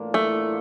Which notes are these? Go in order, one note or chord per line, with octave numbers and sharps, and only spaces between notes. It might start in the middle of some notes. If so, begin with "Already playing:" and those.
Already playing: A2 E3 A#3 D4 F4
A3